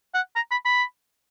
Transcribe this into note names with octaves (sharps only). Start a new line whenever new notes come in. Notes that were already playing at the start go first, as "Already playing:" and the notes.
F#5
A#5
B5
B5